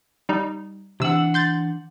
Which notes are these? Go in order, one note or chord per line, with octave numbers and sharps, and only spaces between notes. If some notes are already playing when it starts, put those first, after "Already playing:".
G3 D#4
C3 E3 D4 F#5 E6
C6 G6 A6